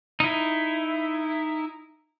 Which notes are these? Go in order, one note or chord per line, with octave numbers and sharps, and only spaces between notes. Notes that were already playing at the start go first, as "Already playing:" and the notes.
D#4 E4